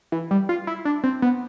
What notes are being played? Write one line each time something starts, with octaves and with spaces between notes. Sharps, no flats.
E3
G3
F4
E4
D4
C4
B3